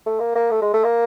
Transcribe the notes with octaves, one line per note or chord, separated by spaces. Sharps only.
A3
A#3
A#3
A3
G#3
A3
A#3